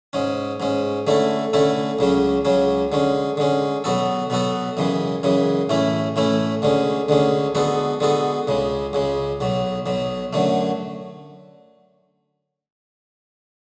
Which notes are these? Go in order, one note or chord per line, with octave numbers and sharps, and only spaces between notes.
G#2 G#3 C#4
G#2 G#3 C#4
D3 A3 C#4 E4 A4
D3 A3 C#4 E4 A4
C#2 C#3 F#3 C#4
C#2 C#3 F#3 C#4
D3 G#3 C#4
D3 G#3 C#4
B2 F#3 B3 F#4 A4
B2 F#3 B3 F#4 A4
F#2 C#3 E3 G#3
F#2 C#3 E3 G#3
A2 E3 A3 C#4 E4
A2 E3 A3 C#4 E4
D2 D3 G#3 C#4
D2 D3 G#3 C#4
D3 G#3 B3 F#4 A4
D3 G#3 B3 F#4 A4
C#2 C#3 G#3
C#2 C#3 G#3
B1 B2 F#3
B1 B2 F#3
F#2 D3 F#3 A3